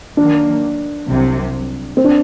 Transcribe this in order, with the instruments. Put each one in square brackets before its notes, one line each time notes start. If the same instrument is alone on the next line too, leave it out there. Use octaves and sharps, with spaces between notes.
[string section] D#3 F#3 A#3 [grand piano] D4
[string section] C2 C3 F#3
[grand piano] C4
D4